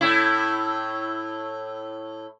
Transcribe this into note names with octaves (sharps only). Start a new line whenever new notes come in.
A2 E4